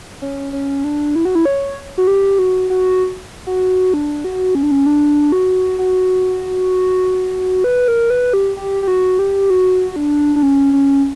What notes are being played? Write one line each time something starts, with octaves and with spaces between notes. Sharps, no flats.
C#4
C#4
D4
E4
F#4
E4
C#5
F#4
G4
F#4
F#4
F#4
D4
F#4
C#4
D4
C#4
D4
F#4
F#4
B4
A#4
B4
G4
G4
G4
F#4
G4
F#4
D4
D4
C#4
C#4